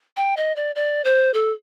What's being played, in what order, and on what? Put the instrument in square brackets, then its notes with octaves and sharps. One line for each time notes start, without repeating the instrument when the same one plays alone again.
[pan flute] G5
D#5
D5
D5
C5
A4